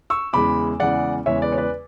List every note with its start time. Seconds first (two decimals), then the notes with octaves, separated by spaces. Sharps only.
0.10 C#6 E6
0.33 E2 C#3 E3 G#3 B5 D6
0.80 E2 C#3 E3 G#3 D5 F#5
1.26 E2 C#3 E3 G#3 C#5 E5
1.42 B4 D5
1.52 C#5
1.58 B4 D5